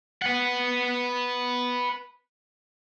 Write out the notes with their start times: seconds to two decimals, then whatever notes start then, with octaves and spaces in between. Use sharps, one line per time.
0.22 B4 F#5